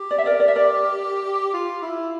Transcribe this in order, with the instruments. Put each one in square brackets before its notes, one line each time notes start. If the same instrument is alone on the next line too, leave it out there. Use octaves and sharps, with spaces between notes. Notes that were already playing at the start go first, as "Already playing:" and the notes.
Already playing: [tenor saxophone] G4
[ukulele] D5
E5
A#4 D5
D5
E5
A#4 D5
[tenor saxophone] F4
E4